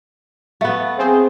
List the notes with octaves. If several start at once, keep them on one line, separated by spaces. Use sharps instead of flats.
A3 B3 F5
C4 G#4